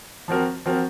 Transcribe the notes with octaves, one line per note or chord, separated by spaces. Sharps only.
F3 C4 F#4 A#4
F3 C4 F#4 A#4